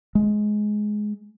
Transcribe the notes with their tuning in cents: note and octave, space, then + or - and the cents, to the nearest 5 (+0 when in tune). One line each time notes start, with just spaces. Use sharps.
G#3 +15